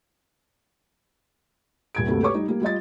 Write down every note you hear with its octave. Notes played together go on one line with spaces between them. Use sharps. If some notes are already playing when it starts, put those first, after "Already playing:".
D#1 G#6 D7
D2 G2 C3 A3 A#3
G4 B4 C#5 C#6 D6
G3 D#4
G3 A#3
G3 F4 D#5 A6